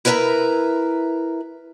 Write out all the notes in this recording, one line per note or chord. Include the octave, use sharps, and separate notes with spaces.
E4 A#4 B4 C#5 E5 A#5